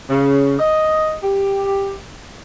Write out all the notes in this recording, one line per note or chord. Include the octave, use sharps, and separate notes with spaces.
C#3
D#5
G4